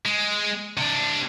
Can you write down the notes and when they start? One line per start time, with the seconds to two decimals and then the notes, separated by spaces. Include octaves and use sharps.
0.06 G#3
0.78 C3 D4